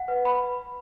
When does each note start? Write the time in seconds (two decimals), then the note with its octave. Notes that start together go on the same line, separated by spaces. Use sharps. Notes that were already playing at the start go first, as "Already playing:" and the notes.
Already playing: F#5
0.08 B4
0.25 B5